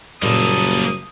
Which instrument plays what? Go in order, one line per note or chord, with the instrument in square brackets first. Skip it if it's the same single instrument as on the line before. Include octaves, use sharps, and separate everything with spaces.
[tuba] F#1 [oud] A#2 G3 [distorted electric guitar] A#3 A4 [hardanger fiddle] D#6